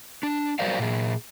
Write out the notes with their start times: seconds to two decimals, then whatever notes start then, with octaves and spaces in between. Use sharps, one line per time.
0.23 D4
0.59 F#3 G3 A#4 C5 D5 F5
0.79 A#2 G#4